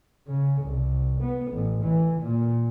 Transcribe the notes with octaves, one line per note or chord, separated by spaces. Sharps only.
C#3
C2
B3
A1
E3
A#2